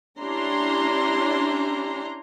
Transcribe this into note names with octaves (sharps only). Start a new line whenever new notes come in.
C#4 D4 E4 G4 A#5 C6